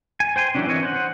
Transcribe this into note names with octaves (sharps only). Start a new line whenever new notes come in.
G#5
C5 G5 G#5 C6
E3 F#3 C#4 D4
E3 C4 A#4 C#5 D#5
C5 F#5